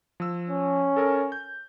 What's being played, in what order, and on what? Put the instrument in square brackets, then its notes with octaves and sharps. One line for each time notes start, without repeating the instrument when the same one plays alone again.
[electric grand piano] F3 E6
[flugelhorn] C#4
[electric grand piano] A4 A#4 G#5
G6